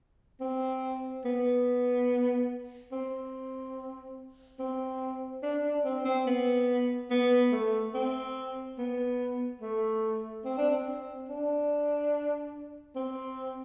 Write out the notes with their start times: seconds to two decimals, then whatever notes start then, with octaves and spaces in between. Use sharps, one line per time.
0.41 C4
1.25 B3
2.92 C4
4.60 C4
5.43 D4
5.64 D4
5.84 C4
6.05 C4
6.27 B3
7.11 B3
7.52 A3
7.94 C4
8.78 B3
9.62 A3
10.45 C4
10.58 D4
10.70 C4
11.29 D4
12.96 C4